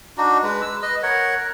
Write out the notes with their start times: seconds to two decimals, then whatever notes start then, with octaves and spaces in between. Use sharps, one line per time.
0.18 D4 D#4 F#4
0.43 G#3 B4
0.62 E6
0.82 B4 D#5
1.03 A#4 C#5 F#5
1.38 A#4